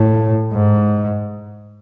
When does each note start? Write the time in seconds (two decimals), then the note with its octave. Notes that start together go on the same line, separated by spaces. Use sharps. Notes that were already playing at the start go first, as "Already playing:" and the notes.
Already playing: A2
0.53 G#2